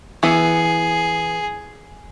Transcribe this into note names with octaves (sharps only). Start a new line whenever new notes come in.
E3 B3 G#4